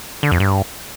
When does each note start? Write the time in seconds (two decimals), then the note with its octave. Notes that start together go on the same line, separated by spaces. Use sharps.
0.23 D3
0.32 F2
0.40 G2